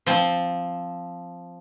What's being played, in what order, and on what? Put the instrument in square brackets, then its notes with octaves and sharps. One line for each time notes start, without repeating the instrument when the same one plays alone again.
[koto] F3 C4